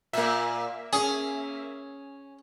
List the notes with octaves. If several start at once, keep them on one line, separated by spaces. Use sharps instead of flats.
A#2 A#3 E5
C#4 G#4